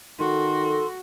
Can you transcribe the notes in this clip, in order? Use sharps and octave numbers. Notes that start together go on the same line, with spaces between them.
D#3 F#4 A4 C6